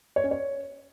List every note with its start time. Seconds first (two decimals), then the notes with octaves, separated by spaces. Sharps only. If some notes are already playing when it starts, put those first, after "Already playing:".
0.16 C#5
0.24 C#4
0.31 C#5